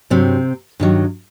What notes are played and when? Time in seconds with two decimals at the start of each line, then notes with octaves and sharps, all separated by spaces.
0.10 G2 C3 F#3 C4
0.80 G2 D#3 F#3